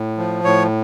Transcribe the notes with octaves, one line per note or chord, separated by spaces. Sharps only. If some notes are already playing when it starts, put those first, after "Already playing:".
Already playing: A2
F3
A2 C#5